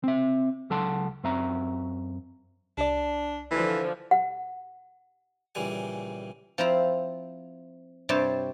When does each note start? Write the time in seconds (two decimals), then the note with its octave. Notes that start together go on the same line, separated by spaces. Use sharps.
0.04 C4 E5
0.70 C#2 F#3 A4 F#5 A5 C6
1.23 F#2 C4 E5 A#5
2.78 C2 D4 D5
3.51 D3 E3 F3
4.11 F#5
5.55 A#1 C#3 E3 G3 G#5
6.58 F3 C4 E4 A#5
8.09 G2 C3 G3 C5 C#5 A5